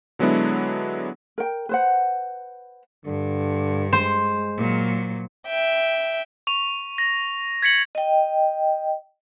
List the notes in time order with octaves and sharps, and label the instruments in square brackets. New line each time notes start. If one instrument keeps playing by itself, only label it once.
[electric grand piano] D3 F#3 G#3 B3 D4 E4
[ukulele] A#4 G5
B4 C5 F#5
[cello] G2 [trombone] D3
[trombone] G#3 [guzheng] C5
[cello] A#2 F#3
[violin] E5 G5
[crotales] C#6 F7
A#6
G#6 B6 C#7 F#7
[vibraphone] D#5 G5